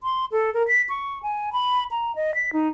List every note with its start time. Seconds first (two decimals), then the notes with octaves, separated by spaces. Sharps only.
0.03 C6
0.32 A4
0.54 A#4
0.68 B6
0.89 C#6
1.23 G#5
1.53 B5
1.91 A#5
2.16 D#5
2.35 B6
2.53 D#4